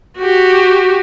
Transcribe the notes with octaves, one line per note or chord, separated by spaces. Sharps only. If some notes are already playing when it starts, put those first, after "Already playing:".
F#4 G4